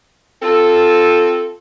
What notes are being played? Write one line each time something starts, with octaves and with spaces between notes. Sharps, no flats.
C4 F4 A4